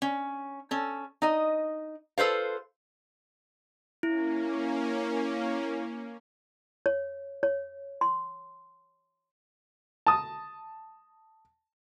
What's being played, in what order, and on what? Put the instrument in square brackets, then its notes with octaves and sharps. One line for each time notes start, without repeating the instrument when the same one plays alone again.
[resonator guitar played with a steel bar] C#4
C#4 A4
D#4 D#5
F4 A4 B4 C5 F5
[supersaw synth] A#3 C#4 [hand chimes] E4
[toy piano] C#5
C#5
C6
[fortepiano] A5 D#6